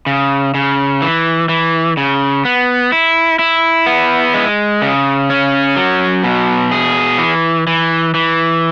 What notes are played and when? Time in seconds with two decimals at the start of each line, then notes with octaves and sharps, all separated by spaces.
0.06 C#3
0.54 C#3
1.02 E3
1.49 E3
1.97 C#3
2.45 B3
2.92 E4
3.39 E4
3.86 B3
4.34 G#3
4.82 C#3
5.30 C#4
5.76 F#3
6.24 B2
6.72 G#4
7.19 E3
7.67 E3
8.14 E3